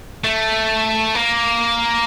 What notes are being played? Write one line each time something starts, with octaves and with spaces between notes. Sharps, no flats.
A3
A#3